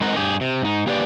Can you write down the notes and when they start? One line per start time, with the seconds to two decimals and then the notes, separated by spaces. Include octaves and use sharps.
0.01 G#3 C4 D#4 A#4 F#5
0.16 G2 G4 G#4
0.41 C3
0.62 G#2 D#4
0.87 A#3 G4 G#4 B4 D5 G5